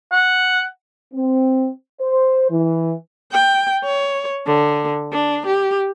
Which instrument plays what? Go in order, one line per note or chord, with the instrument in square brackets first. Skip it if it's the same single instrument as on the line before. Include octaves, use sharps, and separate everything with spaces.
[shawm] F#5
[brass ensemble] C4
C5
E3
[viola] G5
C#5
D3
D4
G4